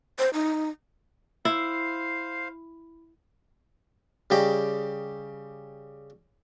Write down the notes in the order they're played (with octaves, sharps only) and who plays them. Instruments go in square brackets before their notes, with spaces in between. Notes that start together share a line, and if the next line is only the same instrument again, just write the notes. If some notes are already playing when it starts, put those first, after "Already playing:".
[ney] C5
D#4
[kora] E4 [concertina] C5 F5
[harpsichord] C#3 G3 G4 D#5